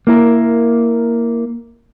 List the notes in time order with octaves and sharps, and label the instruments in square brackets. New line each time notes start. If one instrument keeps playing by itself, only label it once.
[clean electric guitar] A#3 E4 A#4